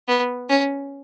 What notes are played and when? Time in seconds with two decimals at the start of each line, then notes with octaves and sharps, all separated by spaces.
0.08 B3
0.49 C#4